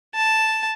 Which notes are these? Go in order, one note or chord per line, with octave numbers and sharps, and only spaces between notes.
A5